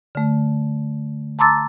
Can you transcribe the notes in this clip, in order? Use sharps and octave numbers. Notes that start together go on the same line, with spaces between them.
D3 A3
A5 A#5 C6 D6 E6 A6